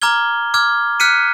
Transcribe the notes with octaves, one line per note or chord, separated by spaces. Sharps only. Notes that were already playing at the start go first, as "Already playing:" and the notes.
A#5 D6 F6 G#6 G7
D6 F6 G#6
F6 F#6 B6 C#7 D#7